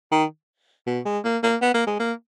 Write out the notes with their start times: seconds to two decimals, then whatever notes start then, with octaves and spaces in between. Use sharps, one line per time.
0.11 D#3
0.87 B2
1.06 G#3
1.24 A#3
1.43 A#3
1.62 B3
1.74 A#3
1.87 G#3
2.00 A#3